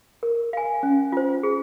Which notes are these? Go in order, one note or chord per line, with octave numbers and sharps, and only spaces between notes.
A#4
F5 G#5
C#4
F4 C5
G#4